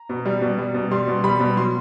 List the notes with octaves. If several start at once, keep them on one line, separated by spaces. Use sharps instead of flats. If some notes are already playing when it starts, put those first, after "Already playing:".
Already playing: A#5
B2
G3
B2
G3
B2
G3 C6
B2
G3 B5
B2
F#3 C6